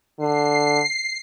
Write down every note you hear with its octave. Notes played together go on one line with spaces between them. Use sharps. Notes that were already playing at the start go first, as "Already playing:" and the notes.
D3 C7